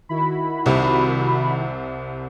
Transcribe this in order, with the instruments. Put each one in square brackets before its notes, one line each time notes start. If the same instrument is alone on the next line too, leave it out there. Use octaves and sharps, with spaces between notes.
[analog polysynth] D#3 E4 F#4 [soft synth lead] B5
[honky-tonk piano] C2 C3